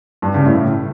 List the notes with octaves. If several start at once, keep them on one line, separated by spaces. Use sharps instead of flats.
G2
C#3
A2